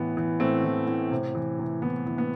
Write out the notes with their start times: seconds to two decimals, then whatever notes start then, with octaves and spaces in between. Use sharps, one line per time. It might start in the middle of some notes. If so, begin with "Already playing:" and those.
Already playing: A2 E3 B3
0.17 E3
0.40 A2 A3 C4
0.64 E3
0.87 A2
1.11 C3
1.35 E3
1.59 C3
1.82 E3 B3
2.06 E3
2.18 B3